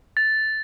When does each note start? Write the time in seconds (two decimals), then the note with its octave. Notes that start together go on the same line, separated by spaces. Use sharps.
0.17 A6